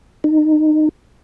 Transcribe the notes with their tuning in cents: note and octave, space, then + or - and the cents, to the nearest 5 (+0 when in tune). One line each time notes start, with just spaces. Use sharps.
D#4 -20